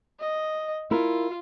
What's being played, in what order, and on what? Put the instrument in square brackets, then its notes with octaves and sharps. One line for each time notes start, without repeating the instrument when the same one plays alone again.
[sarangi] D#5
[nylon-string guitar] E4 A#4 [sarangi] F4